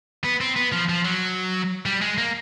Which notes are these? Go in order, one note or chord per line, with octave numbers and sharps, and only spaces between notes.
B3
C4
B3
F3
F3
F#3
G3
G#3
A#3